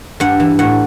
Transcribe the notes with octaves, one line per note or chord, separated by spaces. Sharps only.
G2 F#5
E3
A2 F#5